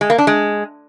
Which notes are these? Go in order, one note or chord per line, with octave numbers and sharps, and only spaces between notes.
G#3
A#3
D4
G#3